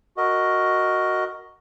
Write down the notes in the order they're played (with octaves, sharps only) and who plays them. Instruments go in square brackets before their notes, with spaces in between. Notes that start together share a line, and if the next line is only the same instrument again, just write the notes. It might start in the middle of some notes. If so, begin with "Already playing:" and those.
[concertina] F#4 A#4 D#5